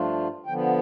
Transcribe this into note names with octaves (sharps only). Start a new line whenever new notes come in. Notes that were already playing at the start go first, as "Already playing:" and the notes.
Already playing: G2 F3 A3 D4 F4
D3 F3 B3 G5